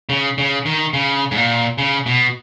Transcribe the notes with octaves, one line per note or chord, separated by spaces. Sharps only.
C#3
C#3
D#3
C#3
G#2
A#2
C#3
B2